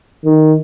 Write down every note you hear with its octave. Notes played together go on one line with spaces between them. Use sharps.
D#3